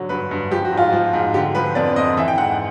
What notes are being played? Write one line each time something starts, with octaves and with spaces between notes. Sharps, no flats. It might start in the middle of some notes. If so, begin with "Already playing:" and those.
Already playing: G#2 D3 F#3
G2 B4
G2
F3 G4
F#4
G#2
F4
F3 F#4
G#2
D3 G4
F3 B4
F2 D5
F2 D#5
E3 E5
G5
G#2 F#5